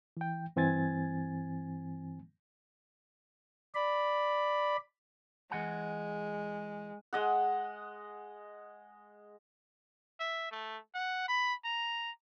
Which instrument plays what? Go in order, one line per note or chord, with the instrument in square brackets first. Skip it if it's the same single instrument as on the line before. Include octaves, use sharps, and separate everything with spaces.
[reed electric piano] E3 G5
G2 E3 C4 G#5 G#6 A6
[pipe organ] D5 B5
[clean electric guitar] E3 F#5 G#5 [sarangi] G#3
[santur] G#3 D#5 F#5
[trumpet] E5
A3
F#5
B5
A#5